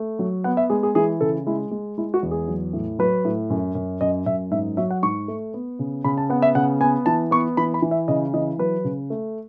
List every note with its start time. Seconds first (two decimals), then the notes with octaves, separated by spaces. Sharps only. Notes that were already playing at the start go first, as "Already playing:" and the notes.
Already playing: A3
0.19 F#3
0.44 B3 F#5
0.57 E5
0.70 G#3 G#4
0.83 G#4
0.95 E3 G#4
1.21 C#3 A4
1.47 G#3 E4
1.71 G#3
1.98 G#3 E4
2.14 F#4
2.23 E2
2.31 G#4
2.48 F#3
2.73 A2
2.99 F#3 B4
3.25 A2
3.50 F#2
3.75 F#2
4.01 F#2 D#5
4.26 F#2 E5
4.51 G#2 E5
4.77 F#3 E5
4.91 F#5
5.03 G#2 C#6
5.28 A3
5.54 B3
5.79 C#3
6.04 C#3 B5
6.17 A5
6.30 B3 F#5
6.42 E5
6.55 C#3 F#5
6.81 B3 G#5
7.06 E3 A5
7.31 B3 C#6
7.57 E3 B5
7.74 B5
7.82 E3
7.91 E5
8.08 C#3 D#5
8.33 E3 D#5
8.59 F#3 B4
8.84 C#3
9.10 A3